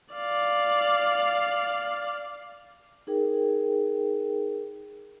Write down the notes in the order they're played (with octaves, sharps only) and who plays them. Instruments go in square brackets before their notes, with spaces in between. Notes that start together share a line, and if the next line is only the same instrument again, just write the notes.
[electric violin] D5 F5
[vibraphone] D#4 G#4 A#4 G5